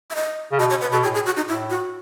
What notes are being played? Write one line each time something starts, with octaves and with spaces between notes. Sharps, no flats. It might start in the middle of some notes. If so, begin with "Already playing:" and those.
E5
D#5
C#3
B2 D#5
C#5
B4
B2 A4
A2 G#4
G#4
F#4
D#4
A2 E4
F#4